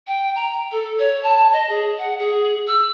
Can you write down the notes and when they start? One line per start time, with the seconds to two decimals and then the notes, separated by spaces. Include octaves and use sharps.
0.07 G5
0.35 A#5
0.71 A4
0.99 C#5
1.23 A5
1.53 D#5
1.69 G#4
1.98 F#5
2.18 G#4
2.67 E6